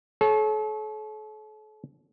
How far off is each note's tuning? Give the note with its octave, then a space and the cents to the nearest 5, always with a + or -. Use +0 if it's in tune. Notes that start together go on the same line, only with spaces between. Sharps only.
A4 -40 C#5 -15